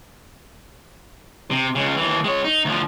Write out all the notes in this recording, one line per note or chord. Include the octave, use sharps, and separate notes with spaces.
C3
C#2 C#3
D#2 E3
G#3 C#5
D#4
D2 F3